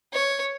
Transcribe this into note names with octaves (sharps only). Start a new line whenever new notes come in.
C#5